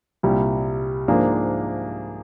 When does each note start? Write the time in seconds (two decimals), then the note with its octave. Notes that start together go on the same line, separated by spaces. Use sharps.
0.23 C2 A#2 G3
1.08 G#2 F3 A#3 D4 G#4